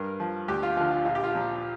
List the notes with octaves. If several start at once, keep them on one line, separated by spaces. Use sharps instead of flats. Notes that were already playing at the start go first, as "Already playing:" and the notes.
Already playing: G2 A#4
F3
D2 G4
F4
D3 F3 F4
F4
A#1 F4
G4
F4
A#2 F3